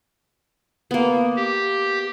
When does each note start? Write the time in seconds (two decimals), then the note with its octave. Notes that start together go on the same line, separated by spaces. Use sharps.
0.91 A#3 B3
1.36 G4